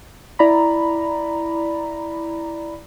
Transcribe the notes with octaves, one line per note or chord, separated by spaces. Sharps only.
E4 D5 A#5 B5